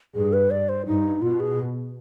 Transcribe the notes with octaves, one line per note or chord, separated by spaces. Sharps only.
G2 G#4
B4
D5
C5
G2 D#4
B2 F4
G#4